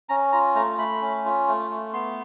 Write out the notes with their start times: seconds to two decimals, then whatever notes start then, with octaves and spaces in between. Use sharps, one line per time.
0.09 C#4 A#5
0.32 F4 A#5
0.55 A3 A#5
0.78 A3 B5
1.01 C#4
1.25 F4
1.48 A3
1.70 A3
1.93 B3 C6